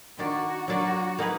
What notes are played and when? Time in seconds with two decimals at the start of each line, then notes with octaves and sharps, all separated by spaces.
0.18 D#3 A#3 D4 F#4
0.68 F#3 A#3 D4 F4 F#4
1.19 A#3 D#4 G#4 B4